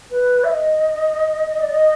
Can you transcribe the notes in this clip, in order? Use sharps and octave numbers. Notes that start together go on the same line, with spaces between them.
B4
E5
D#5
D5
D#5